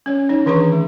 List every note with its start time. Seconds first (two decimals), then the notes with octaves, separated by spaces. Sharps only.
0.06 C#4 C#5
0.29 D#4 C#5
0.46 D#3 E3 D4 G#4 C#5 C#6
0.72 A3